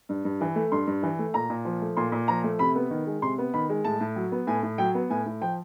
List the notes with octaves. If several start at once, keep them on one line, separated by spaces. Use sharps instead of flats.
G2
G2
E3
A3
G2 C6
G2
E3
A3
A#2 A#5
A#2
F3
A3
A#2 C6
A#2
F3 A#5
A3
C3 B5
B3
D#3
G#3
C3 C6
B3
D#3 B5
G#3
A2 A5
A2
F#3
B3
A2 G#5
A2
F#3 G5
B3
A2 G#5
A2
F3 G5